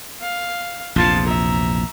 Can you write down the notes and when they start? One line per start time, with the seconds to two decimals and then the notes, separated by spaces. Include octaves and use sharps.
0.21 F5
0.96 A#1 E2 C3 F4 A5
1.27 E5 A#5